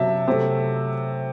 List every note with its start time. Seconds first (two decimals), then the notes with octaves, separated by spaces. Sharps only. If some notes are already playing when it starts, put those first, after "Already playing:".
Already playing: C3 F#3 E5 A5
0.28 C3 F#3 A3